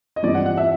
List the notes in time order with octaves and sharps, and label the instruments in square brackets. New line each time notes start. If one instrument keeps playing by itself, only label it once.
[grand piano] D#5
[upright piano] G2 E3 G3 C4 F4 [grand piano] D5
[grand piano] F#5
F#5
E5